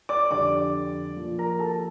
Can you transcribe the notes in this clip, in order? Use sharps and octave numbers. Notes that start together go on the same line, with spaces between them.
D5 D6
F2 D3 G3 D5 D6
A#2 F3
A#4 A#5
A4 A5